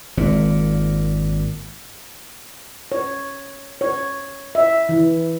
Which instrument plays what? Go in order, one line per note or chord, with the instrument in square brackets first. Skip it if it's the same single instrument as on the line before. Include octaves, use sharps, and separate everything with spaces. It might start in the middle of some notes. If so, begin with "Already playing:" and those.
[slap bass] G#1 A#2
[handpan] C#5
C#5
E5
E3